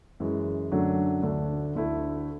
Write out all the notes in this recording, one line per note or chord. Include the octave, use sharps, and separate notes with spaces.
F#2 E3 G#3
F#2 D3 F#3 A3 D4
D2 D3 A3 D4
D2 D3 A3 E4